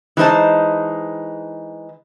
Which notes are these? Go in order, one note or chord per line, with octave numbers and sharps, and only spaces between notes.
E3 G#3 D#4 C5 A5